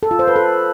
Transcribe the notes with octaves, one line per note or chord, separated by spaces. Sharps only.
A4
F4
C5
B4
A4